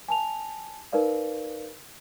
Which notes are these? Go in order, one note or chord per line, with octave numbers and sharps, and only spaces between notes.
G#5 A5 F7
D#4 A#4 B4 D5 F5